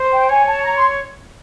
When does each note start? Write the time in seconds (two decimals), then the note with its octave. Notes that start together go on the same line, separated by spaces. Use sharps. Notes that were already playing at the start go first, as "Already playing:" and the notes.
Already playing: C5
0.13 G5
0.29 C#5 G#5
0.47 A5
0.64 A#5
0.75 C6